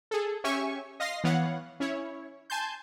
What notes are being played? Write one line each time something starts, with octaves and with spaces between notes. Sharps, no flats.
G#4 A4
C#4 G4 C#5 E5 G#5 C#6
D#5 F5 C6 A#6 C7
E3 B3 C#5 F5 F#5
C#4 E4 C#5
G#5 A5 C6 G6